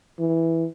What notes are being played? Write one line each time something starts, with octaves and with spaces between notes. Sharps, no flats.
E3